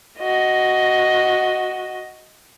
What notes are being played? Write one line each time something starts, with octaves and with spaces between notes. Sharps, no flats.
F#4 D#5